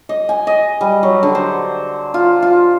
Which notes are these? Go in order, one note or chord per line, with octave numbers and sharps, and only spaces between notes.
D#5
G#5
D#5
G3
F#3
D3
C5
F4
F4